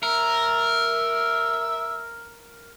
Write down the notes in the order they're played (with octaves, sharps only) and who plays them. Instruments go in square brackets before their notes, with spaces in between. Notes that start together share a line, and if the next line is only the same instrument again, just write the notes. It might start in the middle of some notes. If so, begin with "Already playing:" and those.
[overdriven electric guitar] A#4 [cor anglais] E5